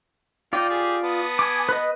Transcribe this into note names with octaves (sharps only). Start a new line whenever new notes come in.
D#4 F4 D5 G5
G4 G#4
B3 A5 D#6
G#5 D6
B4 D#5